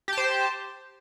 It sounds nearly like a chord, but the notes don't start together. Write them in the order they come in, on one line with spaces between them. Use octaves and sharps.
G4 A5 C5